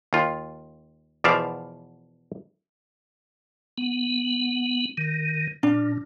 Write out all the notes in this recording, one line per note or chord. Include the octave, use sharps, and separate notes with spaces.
D#2 F4
E2 B2 F3 D5 E5 F5
B3
D#3
A#2 D4